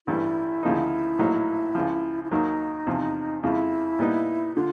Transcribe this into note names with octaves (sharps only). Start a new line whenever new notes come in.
A1 G2 E3 G3 E4
D2 C#3 F3 A#3 D#4
A#1 A2 F#3 A#3 D#4
C#2 C#3 F3
E4
D#2 D#3 F#3 A#3 D#4
E2 C3 F3
F2 C#3 F3 G#3 E4
A#2 G3 B3 D#4
D3 F4